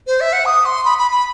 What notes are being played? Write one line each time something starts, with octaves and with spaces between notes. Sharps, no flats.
C5
E5
F#5
D#6
C6
B5
B5
B5